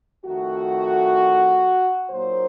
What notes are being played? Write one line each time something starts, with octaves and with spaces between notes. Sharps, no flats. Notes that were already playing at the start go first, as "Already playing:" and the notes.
F2 D#3 A3 F#4
A#2 F#3 A#3 D#4 C5